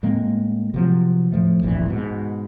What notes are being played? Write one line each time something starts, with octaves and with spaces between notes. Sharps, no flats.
A2 G#3 A#3 C4
C3 F3 F#3
A2 F3 A3
D1 A#1 G2 E3
G#2 B2